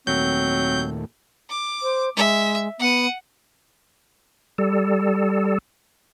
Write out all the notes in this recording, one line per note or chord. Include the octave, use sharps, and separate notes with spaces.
D#2 A#2 F#3 A3 C4 G6
D6
C5
G#3 E5
B3 F#5 D#7
G3 A4